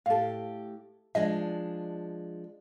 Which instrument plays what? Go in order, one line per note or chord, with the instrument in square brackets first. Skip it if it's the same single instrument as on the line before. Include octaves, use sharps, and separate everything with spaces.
[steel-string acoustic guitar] A2 G4 [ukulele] A4 F5
[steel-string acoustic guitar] F3 G#3 D4 [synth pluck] D#5